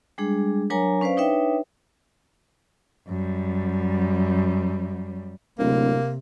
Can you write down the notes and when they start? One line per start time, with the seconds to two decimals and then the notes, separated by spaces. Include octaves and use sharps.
0.18 G3 G#3 D4 G#4
0.70 F#3 D4 A#4 C#5 G#5 A#5
1.01 C#4 B4 C5 D5 F5
1.17 D4 D#4 B4 C#5 E5 G5
3.08 F#2 G3
5.59 D1 C3 A#3